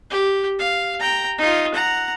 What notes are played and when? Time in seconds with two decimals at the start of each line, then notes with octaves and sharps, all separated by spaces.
0.11 G4
0.59 F5
1.00 G5 A#5
1.38 D#4 F4
1.74 F#5 A#5